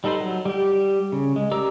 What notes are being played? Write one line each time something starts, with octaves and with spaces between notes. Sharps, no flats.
G3 D#4 A4 B4 C5
F#3
G3 G4
C#3
G#3
G4 A#4 D5 A#5 E6